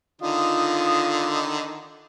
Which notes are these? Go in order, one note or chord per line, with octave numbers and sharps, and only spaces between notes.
D3 D#3 D#4 F4 D#6